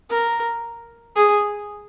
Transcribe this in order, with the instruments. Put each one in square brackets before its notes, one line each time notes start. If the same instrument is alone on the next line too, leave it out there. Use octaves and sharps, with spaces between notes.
[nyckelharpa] A#4
G#4